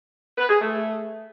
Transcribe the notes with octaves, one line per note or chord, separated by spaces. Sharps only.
B4
G#4
A3